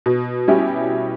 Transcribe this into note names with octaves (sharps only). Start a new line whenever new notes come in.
B2
G3 C#4 E4 G4